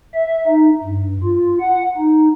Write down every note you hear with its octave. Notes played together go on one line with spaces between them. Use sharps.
E5
D#4
G2
F4
F#5
D#4